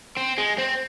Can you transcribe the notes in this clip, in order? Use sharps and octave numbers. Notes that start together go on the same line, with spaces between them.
C4
G#3
C4